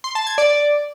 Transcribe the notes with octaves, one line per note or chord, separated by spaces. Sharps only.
C6
A5
G#6
D5